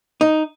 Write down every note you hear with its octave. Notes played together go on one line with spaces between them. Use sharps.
D#4